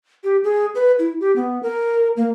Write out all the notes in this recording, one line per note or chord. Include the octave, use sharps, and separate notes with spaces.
G4
G#4
B4
E4
G4
B3
A#4
A#3